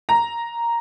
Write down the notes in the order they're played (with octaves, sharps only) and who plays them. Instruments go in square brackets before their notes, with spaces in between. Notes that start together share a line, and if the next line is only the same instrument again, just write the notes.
[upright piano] A#5